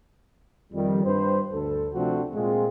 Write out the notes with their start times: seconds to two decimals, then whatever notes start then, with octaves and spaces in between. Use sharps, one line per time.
0.73 F2 D#3 G3
1.04 G2 B4 C5
1.52 D2 A4
1.94 C3 F3 A3 C4 D4 F#4
2.34 A#2 G#3 C4 F4 G#4